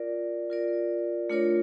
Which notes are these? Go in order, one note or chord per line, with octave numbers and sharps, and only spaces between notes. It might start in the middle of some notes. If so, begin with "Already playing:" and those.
Already playing: F4 A#4 D5
F4 A#4 D5
A3 D4 F4 A#4 C#5